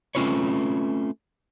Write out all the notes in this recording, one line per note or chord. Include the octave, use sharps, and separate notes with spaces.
A3 C4 C#4 F4 B4 C#5